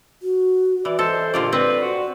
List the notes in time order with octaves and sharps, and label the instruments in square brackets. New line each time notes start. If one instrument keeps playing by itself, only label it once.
[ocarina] F#4
[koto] E3 [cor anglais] D5
[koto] A4 [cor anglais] C5 [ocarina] D#5
[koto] A#2 D3 D5 [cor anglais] F4 [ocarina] G4
[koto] C4 [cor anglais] B4 [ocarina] D5
[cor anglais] F#4